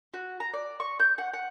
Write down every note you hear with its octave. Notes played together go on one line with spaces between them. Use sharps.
F#4
A#5
D5
C#6
G6
F#5
F#5